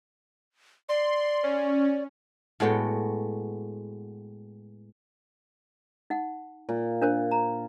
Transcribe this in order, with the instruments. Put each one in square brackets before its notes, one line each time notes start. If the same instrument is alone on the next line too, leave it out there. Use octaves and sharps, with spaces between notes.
[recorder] D5 [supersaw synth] C6
[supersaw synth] C#4
[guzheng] A2 G#3 B3 F#4 G5
[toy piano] D#4 F#5
[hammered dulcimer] A#2
[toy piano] D4 A#4 C5
A#5